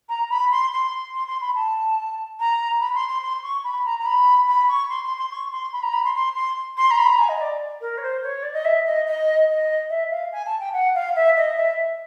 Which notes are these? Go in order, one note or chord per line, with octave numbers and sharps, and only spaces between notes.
A#5
B5
C6
C6
C6
C6
B5
A5
A#5
B5
C6
C6
C6
C#6
B5
A#5
A#5
B5
B5
C#6
C6
C6
C6
C#6
C6
B5
A#5
B5
C6
C6
C6
C6
A#5
B5
A#5
G#5
D#5
D5
A#4
C#5
C5
C#5
D5
D#5
E5
D#5
D#5
D#5
E5
F5
G#5
A5
G5
F#5
F5
E5
D#5
E5